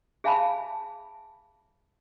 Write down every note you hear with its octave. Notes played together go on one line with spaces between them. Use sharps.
G#4 E5 F5 G#5 A5 B5